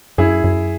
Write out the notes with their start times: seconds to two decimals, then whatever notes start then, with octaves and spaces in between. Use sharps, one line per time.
0.18 F#2 E4 G#4
0.44 F#2